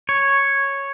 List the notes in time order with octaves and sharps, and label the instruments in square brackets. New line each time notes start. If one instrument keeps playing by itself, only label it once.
[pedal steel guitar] C#5